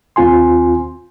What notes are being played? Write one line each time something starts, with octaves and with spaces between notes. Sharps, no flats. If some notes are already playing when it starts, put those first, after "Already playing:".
D#2 C4 F4 G#5 C6